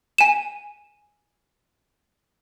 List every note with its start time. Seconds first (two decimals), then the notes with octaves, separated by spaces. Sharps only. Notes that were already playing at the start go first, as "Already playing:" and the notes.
0.18 G#5 E7